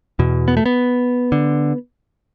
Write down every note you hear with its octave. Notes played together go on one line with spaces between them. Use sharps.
E2 B2
B3
A3
B3
D3